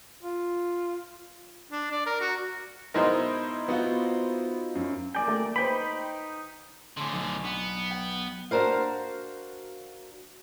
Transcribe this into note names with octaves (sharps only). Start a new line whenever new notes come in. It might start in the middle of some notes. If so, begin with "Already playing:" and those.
F4
D4
D5
A#4
F#4
B2 G#3 D#4 E4 A#4 C5
B3 F4 F#4
F#2
A#3 D5 G5 G#5
A3
D#4 B4 C5 G5 B5
A2 D3 G#5 C6
B1
B3
F#5 G5
D4 F#4 A#4 C5 F5